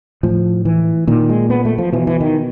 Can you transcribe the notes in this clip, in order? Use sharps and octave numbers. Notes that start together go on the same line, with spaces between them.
A2 F3
E3
A#2 D#3
G#3
B3
A3
F3
B2 E3
E3
D#3